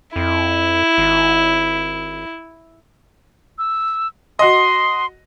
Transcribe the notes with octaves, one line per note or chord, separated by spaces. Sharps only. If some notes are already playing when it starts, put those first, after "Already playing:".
F2 E4
G#1
E6
F#4 D#5 C6